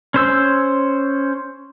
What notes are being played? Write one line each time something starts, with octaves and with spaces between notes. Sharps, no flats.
C#4 C5 E6